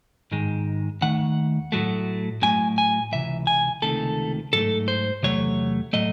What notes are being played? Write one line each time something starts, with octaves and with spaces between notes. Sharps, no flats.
G#2 D#3 G#3
D#2 D#3 A3 F#5
A2 F#3 A3
A2 F#3 A3 G#5
G#5
C#2 C3 E3 E5
G#5
C#2 C3 D#3 A3 A4
G#2 F#3 A3 A4
C5
E2 C3 F#3 A3 C#5
A2 F#3 A3 D#5